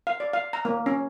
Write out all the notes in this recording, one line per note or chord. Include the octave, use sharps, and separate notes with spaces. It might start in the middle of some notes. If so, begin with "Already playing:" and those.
F5
D5
F5
A#5
A#3
C#4